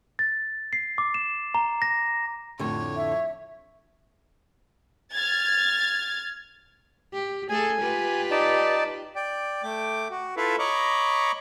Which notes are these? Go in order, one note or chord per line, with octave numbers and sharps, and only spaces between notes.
A6
C7
D6
E7
A#5
A#6
F2 A2 D3 C#5
E5
F6 G#6 A6
G4
A3 G#4 A4 G#5
F4 G4 B4
D#4 D5 A5
D5 G5
A3 G5 D6
F#4
E4 F4 A4 B4 E5 F5
C#5 D#5 A#5 B5 C#6 D6